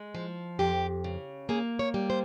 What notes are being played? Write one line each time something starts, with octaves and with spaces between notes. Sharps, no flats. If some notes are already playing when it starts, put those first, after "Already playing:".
Already playing: G#3
F3
F2 G4
C#3
A#3 G#4
C#5
G3
C5